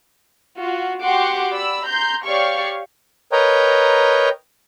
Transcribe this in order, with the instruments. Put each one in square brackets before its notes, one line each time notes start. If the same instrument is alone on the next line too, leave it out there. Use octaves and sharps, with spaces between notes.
[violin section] F4 F#4
F#4 G4 F#5 C6 D6
D5 B5 E6
A#5 C6 G6
G4 C#5 D5 F5 C#6
[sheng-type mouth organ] A#4 B4 C#5 D#5 G5 A#5